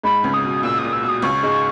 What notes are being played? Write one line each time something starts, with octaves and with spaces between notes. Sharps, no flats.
G#2 G#3 B5
C#2 C#3
C#3 D#6
B2
A#2 E6
D#6
A#2
E6
B2
D#6
C#2 C#3 C#6
G#2 G#3